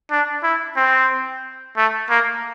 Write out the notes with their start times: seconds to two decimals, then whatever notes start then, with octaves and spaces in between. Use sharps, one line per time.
0.11 D4
0.43 E4
0.76 C4
1.77 A3
2.10 A#3